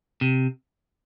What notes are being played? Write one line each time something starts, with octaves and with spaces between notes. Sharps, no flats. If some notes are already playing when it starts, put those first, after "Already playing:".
C3